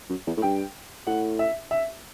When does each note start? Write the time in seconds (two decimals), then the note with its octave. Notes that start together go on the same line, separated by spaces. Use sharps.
0.10 F#2
0.27 E2
0.37 A2
0.42 G2 G5
1.07 A2 F#5
1.39 E5
1.71 E5